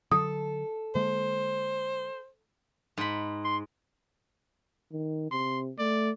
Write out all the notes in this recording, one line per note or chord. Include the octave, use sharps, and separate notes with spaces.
D3 F#3 A4 D#6
D3 G#3 A#3 C5
G#2 B5
C6
D#3
C3 C6
A3 D5